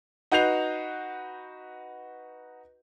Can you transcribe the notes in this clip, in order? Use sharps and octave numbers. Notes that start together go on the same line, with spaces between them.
D#4 F#4 B4 G6 C7 F7